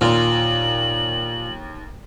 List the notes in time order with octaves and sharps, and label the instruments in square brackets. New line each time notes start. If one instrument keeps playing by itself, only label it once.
[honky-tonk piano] D#2 [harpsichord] A#2 [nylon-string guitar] F4 [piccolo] F#7